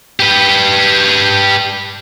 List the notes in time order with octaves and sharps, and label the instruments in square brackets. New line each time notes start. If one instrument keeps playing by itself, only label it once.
[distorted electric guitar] G4 B4